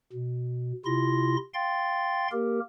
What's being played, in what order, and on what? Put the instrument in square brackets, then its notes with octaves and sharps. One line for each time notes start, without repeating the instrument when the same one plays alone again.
[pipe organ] B2
C3 E4 F4 C6 A#6
F5 G5 C6 A6
A#3 G4 A#4